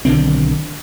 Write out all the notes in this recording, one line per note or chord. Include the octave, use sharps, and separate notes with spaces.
B1 D3 D#3 C4